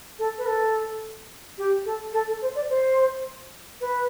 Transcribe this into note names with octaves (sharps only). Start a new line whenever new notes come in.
A4
B4
A4
G4
A4
A4
A4
C5
D5
C5
B4